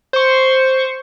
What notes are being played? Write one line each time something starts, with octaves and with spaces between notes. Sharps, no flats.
C5 C#6